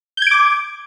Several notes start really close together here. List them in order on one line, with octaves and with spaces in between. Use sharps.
G6 G#6 D7 D6